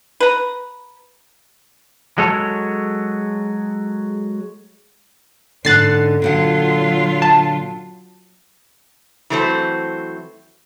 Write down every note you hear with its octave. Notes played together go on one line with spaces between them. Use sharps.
B4 A#5
F#3 G#3 A4 C#5
G#2 D3 C#4 F#6 A6 C7
A#2 D3 F#3 F4 F#5
A5
E3 F#3 A3 C4 C5